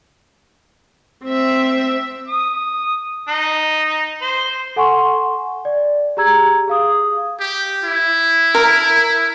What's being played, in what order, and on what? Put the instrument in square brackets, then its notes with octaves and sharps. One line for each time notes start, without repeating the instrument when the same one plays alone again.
[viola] C4 E5
[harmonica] D#6
D#4
C5
[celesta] A4 F#5 G#5 C6 C#6
D5
G4 G#4 A#5 E6 G#6
G#4 F5 D#6
[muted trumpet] G4
E4
[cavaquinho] A#4